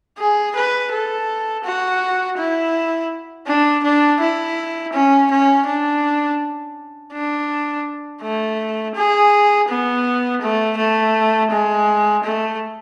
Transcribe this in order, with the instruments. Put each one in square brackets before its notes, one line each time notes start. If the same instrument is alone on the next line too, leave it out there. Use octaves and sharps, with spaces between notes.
[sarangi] G#4
B4
A4
F#4
E4
D4
D4
E4
C#4
C#4
D4
D4
A3
G#4
B3
A3
A3
G#3
A3